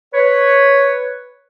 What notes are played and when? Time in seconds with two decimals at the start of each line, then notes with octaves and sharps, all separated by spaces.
0.14 B4 C#5